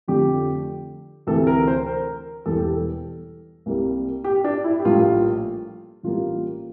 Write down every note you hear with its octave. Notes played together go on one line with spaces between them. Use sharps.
F2 D3 F3 A3 G4
D2 C3 E3 A4
A#4
C5
A#4
E1 E2 E3 G3 A4
G4
A4
C2 C3 G3 A#3
G4
D4
E4
G4
A#1 A2 G3 A#3 F4
A1 A2 G3 A#3 F4